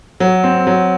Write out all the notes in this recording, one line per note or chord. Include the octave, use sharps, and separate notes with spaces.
F#3
C4
F#3